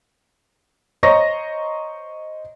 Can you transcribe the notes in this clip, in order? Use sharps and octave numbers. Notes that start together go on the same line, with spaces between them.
C5 C#5 D#5 A#5 C#6 A#6